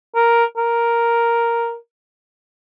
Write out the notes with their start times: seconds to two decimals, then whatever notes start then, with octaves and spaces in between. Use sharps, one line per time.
0.15 A#4
0.57 A#4